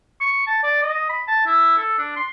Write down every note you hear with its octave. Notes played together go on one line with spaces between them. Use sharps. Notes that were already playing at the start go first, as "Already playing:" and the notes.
C#6
A5
D5
D#5
B5
A5
E4
A4
D4
C6